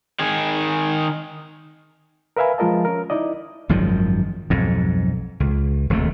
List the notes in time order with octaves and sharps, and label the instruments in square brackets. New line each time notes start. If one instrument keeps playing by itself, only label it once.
[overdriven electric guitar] D#3 G#4
[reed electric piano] A#4 B4 E5 F5 G#5 B5
F3 G#3 F4 A#4 D#5 A5
C#4 A#4
D#4 E4 D5 D#5
[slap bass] G#1 F#2 D#3 F3
B1 F2 G#2
C#2
E1 D#2 C3 A3